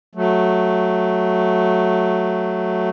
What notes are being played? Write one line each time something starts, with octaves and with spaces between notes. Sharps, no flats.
F#3 A3